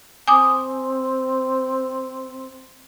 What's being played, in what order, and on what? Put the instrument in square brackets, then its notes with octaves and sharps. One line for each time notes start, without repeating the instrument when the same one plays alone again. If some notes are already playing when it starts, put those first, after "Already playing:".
[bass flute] C4 [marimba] G#5 D6 D#6